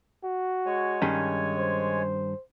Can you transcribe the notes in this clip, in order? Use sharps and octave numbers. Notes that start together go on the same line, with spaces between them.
F#4
G#3 C#5 G#5
G2 D#3 C#4
C5